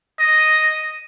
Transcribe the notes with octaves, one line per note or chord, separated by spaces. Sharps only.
D#5